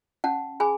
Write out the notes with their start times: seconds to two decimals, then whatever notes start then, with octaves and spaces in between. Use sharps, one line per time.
0.24 C#4 F#5 A5
0.60 G#4 G#5 B5